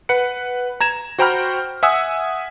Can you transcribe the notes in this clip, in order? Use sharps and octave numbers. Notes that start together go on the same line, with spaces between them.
B4 F#5 C#7
A#5 G#6 E7
F#4 C5 G5 A#5 B5 F6
E5 F#5 G#5 D#6 E6